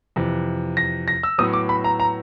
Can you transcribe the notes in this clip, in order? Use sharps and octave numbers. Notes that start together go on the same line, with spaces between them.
F2 C3 E3
A#6
A#6
E6
A2 F#3 B3 D#6
D6
B5
A#5
A#5